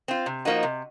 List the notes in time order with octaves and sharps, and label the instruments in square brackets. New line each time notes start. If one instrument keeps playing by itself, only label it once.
[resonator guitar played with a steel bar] C4 F4
C3
F3 A#3 D#4 F#4
C3